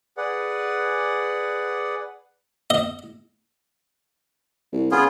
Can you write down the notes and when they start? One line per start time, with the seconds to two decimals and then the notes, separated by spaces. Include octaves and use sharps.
0.17 G#4 B4 D5 F#5
2.70 D#5
4.73 C2
4.91 C#3 B3 F4 G#4